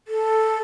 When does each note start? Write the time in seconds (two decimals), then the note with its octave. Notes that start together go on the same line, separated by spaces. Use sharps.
0.08 A4